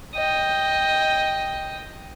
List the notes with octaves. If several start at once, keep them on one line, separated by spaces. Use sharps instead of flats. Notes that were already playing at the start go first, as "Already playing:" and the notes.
D#5 G5